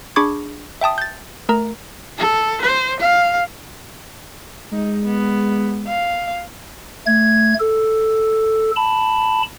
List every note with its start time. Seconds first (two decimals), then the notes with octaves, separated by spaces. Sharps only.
0.16 D4 G#4 B5 C#6 D6 G#6
0.81 E5 G5 A5 D#6
0.98 G6 A6
1.49 A3 A#4 A#5
2.19 A4
2.62 C5
3.00 F5
4.72 G#3 D#4
5.06 B3
5.87 F5
7.06 A3 G#6
7.60 A4
8.76 A5 B5